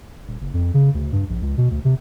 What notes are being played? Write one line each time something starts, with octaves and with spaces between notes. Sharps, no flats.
D#1
F#1
F2
C#3
D2
G2
A#1
C#2
B2
D2
C3